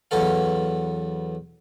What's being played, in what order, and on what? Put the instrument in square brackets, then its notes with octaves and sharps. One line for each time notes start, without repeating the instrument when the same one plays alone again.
[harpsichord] E2 F#3 B3 A4 F5